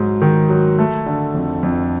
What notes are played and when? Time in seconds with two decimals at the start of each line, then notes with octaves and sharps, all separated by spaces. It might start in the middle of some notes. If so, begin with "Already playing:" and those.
Already playing: G#2 F#3
0.22 D#3
0.49 F#3
0.79 A3
1.06 D3
1.35 F2
1.63 F2